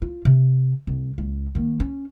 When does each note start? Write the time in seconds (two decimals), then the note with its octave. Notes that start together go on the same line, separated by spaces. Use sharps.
0.02 F4
0.25 C3
0.87 C2
1.18 C#2
1.55 D#3 A#3
1.80 C#4